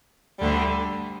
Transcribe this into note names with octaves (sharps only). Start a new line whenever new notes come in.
D2 D3 G3